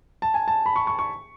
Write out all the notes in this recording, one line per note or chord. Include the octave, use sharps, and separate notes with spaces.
A5
G#5
A5
B5
C#6
C#6
C#6